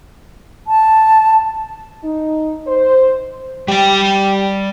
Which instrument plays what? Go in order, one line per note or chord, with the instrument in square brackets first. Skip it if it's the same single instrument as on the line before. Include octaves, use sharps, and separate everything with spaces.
[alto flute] A5
[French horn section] D#4
C5
[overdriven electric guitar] G3 G5 [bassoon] G4